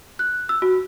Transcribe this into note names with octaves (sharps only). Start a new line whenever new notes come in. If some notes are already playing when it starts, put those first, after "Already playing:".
F#6
E6
F#4